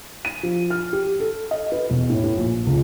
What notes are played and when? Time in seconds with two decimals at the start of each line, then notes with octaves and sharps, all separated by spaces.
0.25 D#7
0.43 F3
0.70 F6
0.93 G4
1.20 A4
1.51 D#5
1.72 B4
1.90 E1
2.10 A2
2.24 A2
2.37 A#1
2.67 C#2